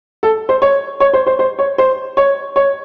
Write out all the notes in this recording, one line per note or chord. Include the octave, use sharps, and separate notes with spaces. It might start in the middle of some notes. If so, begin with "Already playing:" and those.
A4
C5
C#5
C#5
C5
C5
C5
C#5
C5
C#5
C#5